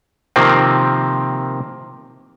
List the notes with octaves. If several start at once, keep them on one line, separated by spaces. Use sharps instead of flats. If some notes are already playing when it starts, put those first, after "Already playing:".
C3 D#3 F3 A#3 C4